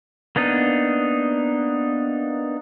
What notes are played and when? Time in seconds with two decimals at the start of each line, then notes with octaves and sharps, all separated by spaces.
0.36 A#3 B3 D4 D#4